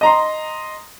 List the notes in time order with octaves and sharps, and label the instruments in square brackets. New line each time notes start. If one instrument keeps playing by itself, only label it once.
[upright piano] D#5 A#5 C6